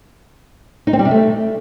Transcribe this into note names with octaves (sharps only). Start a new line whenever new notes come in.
D#4
C4
G3
C3
A3